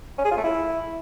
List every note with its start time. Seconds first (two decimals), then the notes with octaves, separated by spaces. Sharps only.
0.18 C#4
0.25 G#4
0.31 F4
0.38 A3
0.44 E4